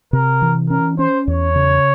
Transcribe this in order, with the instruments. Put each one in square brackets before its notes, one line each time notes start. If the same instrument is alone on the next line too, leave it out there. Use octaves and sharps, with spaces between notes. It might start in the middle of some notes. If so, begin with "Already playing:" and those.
[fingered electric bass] C3 [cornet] A#4
[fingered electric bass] E3
[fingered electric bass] C#4 [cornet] A#4
[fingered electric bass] C#4 [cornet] C5
[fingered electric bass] E2 [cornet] C#5
[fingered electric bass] C#3